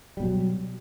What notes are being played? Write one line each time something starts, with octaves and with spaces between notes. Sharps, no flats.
B2 F#3 G3